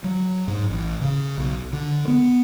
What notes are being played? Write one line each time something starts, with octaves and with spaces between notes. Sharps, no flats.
F#3
G#2
A1
C#3
B1
D3
B3